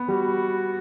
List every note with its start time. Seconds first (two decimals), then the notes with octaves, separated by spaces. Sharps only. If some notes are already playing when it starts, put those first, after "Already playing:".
Already playing: B3
0.08 G3 F#4